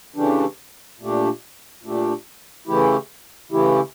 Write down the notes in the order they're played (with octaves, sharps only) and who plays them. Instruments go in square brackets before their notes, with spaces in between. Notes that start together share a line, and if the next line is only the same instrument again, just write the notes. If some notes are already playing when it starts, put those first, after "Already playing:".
[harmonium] C#3 E3 A3 D4 G4
A#2 A3 D4 G4
A#2 A3 D4 G4
C#3 E3 A3 E4 G4
C#3 E3 A3 E4 G4